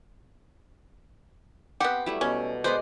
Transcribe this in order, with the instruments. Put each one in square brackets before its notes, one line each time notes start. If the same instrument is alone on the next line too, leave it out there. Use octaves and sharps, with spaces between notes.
[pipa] B3 G4 [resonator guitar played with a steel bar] C4 F#5
[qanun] F#3 G3 A3 [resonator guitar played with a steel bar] E4
[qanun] B2 [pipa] C#4
[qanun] G#3 D5 D#5 [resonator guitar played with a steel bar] B3 B4 [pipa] C5